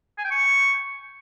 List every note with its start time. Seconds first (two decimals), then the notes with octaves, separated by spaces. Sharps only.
0.18 G#5
0.25 G5
0.31 C#6